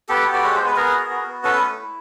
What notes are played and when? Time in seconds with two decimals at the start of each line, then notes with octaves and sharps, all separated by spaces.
0.09 B3 G4 A4
0.26 F#4
0.33 D5
0.43 G#3 C#5
0.55 C5
0.60 B3
0.66 B4
0.76 B3 G#4 A#4
0.94 F#4
1.10 F#4
1.27 B3
1.44 C#4 A4 B4
1.61 A3
1.78 E4